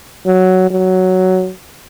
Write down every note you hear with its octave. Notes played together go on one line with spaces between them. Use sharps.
F#3
F#3